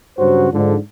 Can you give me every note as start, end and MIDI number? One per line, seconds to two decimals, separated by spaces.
0.18 0.48 43
0.18 0.48 49
0.18 0.48 54
0.18 0.48 66
0.18 0.48 72
0.53 0.76 44
0.53 0.76 50
0.53 0.76 53